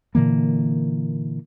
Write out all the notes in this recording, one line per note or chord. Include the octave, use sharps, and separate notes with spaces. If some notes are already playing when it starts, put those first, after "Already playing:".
A#2 D3 E3 A#3